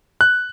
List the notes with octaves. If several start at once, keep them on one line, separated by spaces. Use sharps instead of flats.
F#6